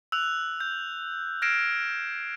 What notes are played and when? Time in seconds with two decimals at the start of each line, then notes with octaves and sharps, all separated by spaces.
0.12 E6 F#6 F7
0.60 G6
1.42 F6 G#6 A#6 C7 D7 E7